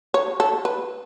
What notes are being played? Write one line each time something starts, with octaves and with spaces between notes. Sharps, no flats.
C#5
A4
B4